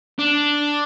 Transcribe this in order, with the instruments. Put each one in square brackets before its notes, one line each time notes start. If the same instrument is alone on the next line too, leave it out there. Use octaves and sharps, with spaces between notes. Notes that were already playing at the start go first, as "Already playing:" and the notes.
[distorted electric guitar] D4